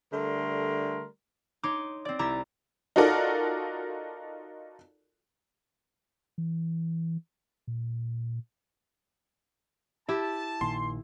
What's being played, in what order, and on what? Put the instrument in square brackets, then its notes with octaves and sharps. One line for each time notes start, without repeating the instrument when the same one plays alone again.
[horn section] D3 G3 A3 A#4 C6
[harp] D#4 C#5 C6 D6
C4 D5
C2 E4 G4 A#5 A6
[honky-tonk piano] D#4 F4 F#4 A4 A#4 D5
[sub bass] E3
A#2
[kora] E4 G4 [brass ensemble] A5
[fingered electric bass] A#1 A#2 D#3 [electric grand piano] C6